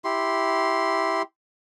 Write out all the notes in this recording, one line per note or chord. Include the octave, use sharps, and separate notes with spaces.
E4 G4 C6